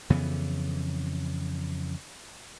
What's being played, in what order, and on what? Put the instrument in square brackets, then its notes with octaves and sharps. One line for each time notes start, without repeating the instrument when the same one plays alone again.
[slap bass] F2 C#3 E3 B3